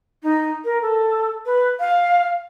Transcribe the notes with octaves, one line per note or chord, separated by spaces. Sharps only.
D#4
A#4
A4
B4
F5